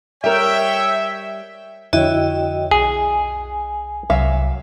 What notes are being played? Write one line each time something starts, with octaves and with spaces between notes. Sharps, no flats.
G3 A#4 C#5 E5 G5
F2 D3 E4 F#4 C#5 D#5 G5
B1 G#4 G#5
C2 F#3 E5 F5